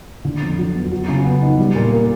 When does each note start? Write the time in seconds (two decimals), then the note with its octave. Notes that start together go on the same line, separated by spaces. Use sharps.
0.25 D3
0.42 F2
0.59 F#3
0.75 B3
0.92 F#3
1.08 C#3
1.25 B3
1.42 D#4
1.59 G3
1.75 A#2
1.92 A#3